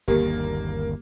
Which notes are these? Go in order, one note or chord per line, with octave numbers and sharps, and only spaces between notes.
G1 D#2 D3 A#3 G4